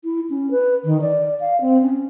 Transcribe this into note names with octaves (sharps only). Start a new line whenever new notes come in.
E4
C#4
B4
D#3
D5
F5
C4
C#4